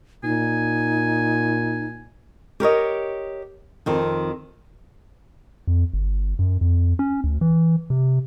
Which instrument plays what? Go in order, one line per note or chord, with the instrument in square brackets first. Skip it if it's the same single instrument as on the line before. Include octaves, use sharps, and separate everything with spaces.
[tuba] A#2 [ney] D#4 [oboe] G#5
[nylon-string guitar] G4 A#4 C#5 D#5
F2 D#3 C4
[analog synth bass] F2
G1
F#2
F2
C#4
D2
E3
C3